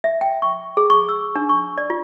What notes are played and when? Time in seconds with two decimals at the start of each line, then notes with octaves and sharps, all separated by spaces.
0.04 E5
0.21 G5
0.42 C#6
0.77 G#4
0.90 C#6
1.09 E6
1.36 D4
1.49 C#6
1.78 D5
1.90 F4